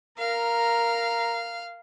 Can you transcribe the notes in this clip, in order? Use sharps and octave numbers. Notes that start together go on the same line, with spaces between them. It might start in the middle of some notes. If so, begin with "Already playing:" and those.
A#4 F5 A#5